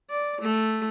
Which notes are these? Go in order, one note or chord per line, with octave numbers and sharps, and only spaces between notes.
D5
A3